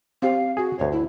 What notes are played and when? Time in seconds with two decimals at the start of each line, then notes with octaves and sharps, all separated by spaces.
0.22 C4 G4 F5
0.57 F#4 G#4
0.79 D2 G2 C#5
0.92 E4